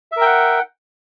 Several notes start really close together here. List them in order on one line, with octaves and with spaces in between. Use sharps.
E5 A#4 G5 F#5